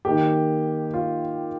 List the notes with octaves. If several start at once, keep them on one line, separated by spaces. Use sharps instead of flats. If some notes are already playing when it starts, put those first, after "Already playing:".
D#3 A#3 G4
F4